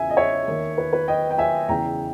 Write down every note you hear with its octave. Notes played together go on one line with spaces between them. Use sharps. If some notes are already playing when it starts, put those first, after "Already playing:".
Already playing: E2 C#3 B3 E5 G#5
D#5
C#5 E5
D#2 D#3 A#3
B4
B4
D#5 G5
G5
E5 G#5
E2 C#3 E3 G5 A#5